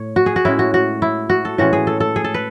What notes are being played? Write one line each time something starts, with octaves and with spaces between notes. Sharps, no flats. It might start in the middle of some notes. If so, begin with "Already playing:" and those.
Already playing: A2 C#5
F#4
G#4
F#4
A2 G#3 C#4 E4
F#4
F#4
E4
F#4
A4
A2 E3 G#3 C#4 F#4
G#4
A4
A4
G#4
A4
B4